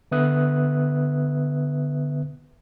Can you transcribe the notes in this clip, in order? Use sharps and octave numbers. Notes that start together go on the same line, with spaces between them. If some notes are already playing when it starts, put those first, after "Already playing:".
D3 B3 B4 E5 D#6 F#6